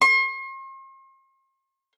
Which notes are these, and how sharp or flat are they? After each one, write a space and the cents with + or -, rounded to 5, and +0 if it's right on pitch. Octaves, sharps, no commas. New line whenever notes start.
C6 +45